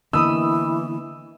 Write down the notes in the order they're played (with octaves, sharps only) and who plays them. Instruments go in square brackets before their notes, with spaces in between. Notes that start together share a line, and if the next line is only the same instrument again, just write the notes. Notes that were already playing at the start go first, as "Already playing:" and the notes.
[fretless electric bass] D3 A#3 B3 [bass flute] E3 [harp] D#5 B5 D#6 [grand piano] E6